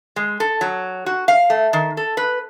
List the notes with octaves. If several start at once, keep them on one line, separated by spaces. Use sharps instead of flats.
G#3
A4
F#3
F#4
F5
A3
D#3
A4
B4